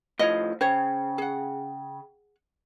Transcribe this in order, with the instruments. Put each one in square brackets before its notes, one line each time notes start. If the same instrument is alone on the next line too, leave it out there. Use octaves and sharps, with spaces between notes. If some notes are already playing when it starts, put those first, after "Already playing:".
[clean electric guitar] A2 F3 [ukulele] C#5 D#5
[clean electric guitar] C#3 [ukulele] C5 C#5 [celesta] G5
[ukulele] G#4 F#5